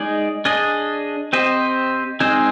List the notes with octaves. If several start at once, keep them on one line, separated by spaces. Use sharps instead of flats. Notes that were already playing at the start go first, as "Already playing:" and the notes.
Already playing: G#3 D#4 G#4 D5
D4 G#4 D#5
C4 G4 C5 D#5
G#3 C4 D#4 G#4 C5